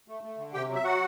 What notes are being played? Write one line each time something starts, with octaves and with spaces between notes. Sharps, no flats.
A3
A3
D3
C3 G4 G5
F#3
E5
F#3 F#4 F#5